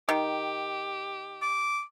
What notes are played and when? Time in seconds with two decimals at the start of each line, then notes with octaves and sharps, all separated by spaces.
0.09 D#3 G4
1.42 D6